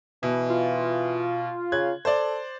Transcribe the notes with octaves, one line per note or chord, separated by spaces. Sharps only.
B2 E3
F4
C#3 F#6 G#6
A4 C5 D5